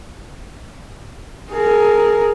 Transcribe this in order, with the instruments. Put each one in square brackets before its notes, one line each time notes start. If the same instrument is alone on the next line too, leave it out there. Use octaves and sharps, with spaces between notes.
[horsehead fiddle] G#4 A#4